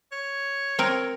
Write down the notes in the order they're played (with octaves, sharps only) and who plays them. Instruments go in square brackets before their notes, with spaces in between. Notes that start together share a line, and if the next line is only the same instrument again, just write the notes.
[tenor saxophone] C#5
[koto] C4 A#4